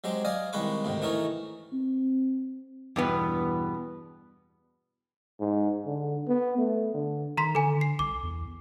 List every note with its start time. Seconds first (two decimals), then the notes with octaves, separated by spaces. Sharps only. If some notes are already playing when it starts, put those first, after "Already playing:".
0.04 F#3 G#3 C4 G4
0.25 D5 D#5 F5 G#5
0.53 C2 D#3 G#3 B4 C#6 D6
0.85 D2 G#2 C3 D#3
1.02 E3 A3 D#4 A#4 C#5
1.73 C4
2.96 E2 G2 B2 B3
5.40 G#2
5.86 D3
6.28 B3
6.58 A3
6.94 D3
7.37 D#3 A#5 C6 B6
7.55 D3 A4 G#5
7.81 C7
7.99 C2 D6
8.23 E2